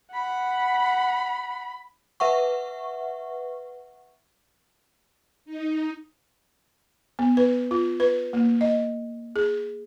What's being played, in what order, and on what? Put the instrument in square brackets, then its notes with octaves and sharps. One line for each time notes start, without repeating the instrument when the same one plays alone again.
[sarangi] F#5 [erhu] B5
[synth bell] B4 E5 F#5 C#6
[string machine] D#4
[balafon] B3
B4
F4
B4
A#3
D#5
G#4